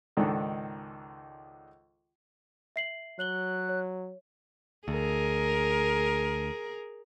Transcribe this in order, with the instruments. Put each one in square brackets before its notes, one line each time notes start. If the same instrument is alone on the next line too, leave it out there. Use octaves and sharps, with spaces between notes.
[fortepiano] C#2 G#2 D#3 D4 A4
[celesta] E5 C7 F#7
[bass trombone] F#3 [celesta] C#5 F#7 G7 [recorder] F#6
[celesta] C#5
[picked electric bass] D2 [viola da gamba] G#4 A#4